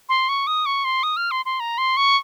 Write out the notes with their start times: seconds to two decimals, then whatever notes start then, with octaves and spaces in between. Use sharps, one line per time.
0.09 C6
0.29 C#6
0.47 D#6
0.66 C#6
0.85 C6
1.03 D#6
1.17 F6
1.31 C6
1.45 C6
1.60 A#5
1.78 C6
1.97 C#6